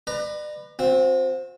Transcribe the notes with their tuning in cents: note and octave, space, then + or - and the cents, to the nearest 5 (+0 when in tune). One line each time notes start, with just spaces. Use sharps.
B4 +10 D5 +40 A#5 +0
C4 +0 F#4 -45